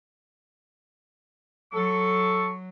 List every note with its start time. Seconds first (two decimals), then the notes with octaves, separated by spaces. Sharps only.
1.74 F#3 A4 C#6